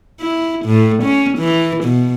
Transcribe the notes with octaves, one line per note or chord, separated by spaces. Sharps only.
E4
A2
C#4
E3
B2